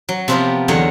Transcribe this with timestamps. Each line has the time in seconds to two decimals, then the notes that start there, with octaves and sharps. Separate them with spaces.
0.09 F#3
0.28 C3 F3 B3 F4 G4 A#4
0.68 E2 D3 F#3 C#5 D#5